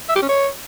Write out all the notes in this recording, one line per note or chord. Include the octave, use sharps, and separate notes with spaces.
E5
G4
C#4
C#5